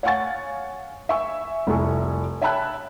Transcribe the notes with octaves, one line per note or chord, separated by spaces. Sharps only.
C#5 F5 F#5 G#5 C#6 A6
E5 G#5 C#6
F1 C2 E4 A4 G#5 C#6
C#5 E5 G5 A5 B5 F#6